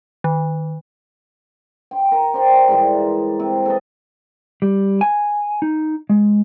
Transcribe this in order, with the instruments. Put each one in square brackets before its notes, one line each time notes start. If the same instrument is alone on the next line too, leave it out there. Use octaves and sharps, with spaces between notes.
[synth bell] D#3
[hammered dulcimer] G5 C6
A#4 A#5
G4 C5 D5 G5
G#2 E3 G3
C3
A4 B4 D#5
[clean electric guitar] G3
G#5
D#4
G#3